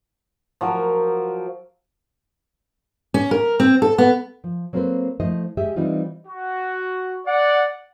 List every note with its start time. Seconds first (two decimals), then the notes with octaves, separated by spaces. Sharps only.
0.61 F3 F#3 A#4
3.14 C#4
3.31 A#4
3.60 C4
3.82 A4
3.98 B3
4.44 F3
4.73 F#3 A#3 C4 A4 B4 C5
5.20 F3 A3 E4 C5 D#5
5.57 G#3 G4 G#4 E5
5.76 E3 G3 C4 D#4 F4
6.27 F#4
7.26 D5 F#5